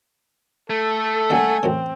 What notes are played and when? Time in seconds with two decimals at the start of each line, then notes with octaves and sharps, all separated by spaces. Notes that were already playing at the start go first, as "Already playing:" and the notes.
0.70 A3 A4
1.30 D#2 C#3 G3 F#5 G#5
1.63 A1 F#2 C#3 C4